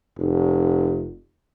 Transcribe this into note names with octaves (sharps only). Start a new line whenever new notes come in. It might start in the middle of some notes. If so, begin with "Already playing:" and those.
F1